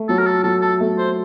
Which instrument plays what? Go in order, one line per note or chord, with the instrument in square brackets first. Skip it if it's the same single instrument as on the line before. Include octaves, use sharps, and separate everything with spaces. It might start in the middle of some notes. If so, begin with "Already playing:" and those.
Already playing: [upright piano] A3
[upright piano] F#3 [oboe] A4
[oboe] A#4
A4
[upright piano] F#3 [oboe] A4
[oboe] A4
[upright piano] A3
[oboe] C5